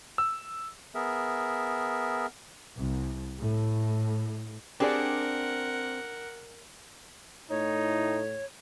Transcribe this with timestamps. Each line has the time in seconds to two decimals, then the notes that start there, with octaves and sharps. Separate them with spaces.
0.18 E6
0.95 B3 G#4 A#4 E5
2.76 C2
3.41 A2
4.80 C4 D4 G4 G#4 A#4 D5 F#5
7.50 A2 D#4 C#5